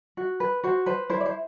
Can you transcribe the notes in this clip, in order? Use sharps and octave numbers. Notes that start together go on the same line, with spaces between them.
F#4
B4
F#4 C5
B4 C5
E4 C5
D5
C5